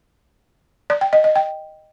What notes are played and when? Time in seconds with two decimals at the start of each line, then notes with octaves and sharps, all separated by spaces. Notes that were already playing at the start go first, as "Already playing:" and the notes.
0.90 D5
1.01 G5
1.13 D#5
1.24 D#5
1.36 G5